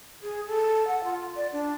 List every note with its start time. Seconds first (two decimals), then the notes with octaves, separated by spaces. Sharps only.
0.22 G#4
0.47 A4
0.88 F#5
1.04 F4
1.36 D5
1.53 D4